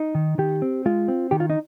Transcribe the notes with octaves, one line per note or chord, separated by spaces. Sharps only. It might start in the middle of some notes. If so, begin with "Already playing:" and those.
Already playing: D#4
D#3
D#3 G4
C4
G#3 F4
C4
D#3 G4
F4
D#4